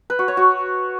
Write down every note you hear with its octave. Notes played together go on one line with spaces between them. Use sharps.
B4
F#4
C#5
F#4